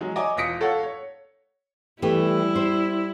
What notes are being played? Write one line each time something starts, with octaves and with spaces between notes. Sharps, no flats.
F#3 G#3
C#5 D#5 G#5 A#5 D6
E1 F4 D#6 A#6 B6 C#7
A4 C#5 F5 F#5
C#5
E3 G3 A3 E4 G4
C5